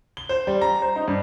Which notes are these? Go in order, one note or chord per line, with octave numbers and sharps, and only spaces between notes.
G7
C5
G3
A#5
C5
D#4
G2